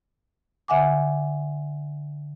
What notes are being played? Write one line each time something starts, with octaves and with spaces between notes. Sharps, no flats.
D3 E5 F#5 G#5 D6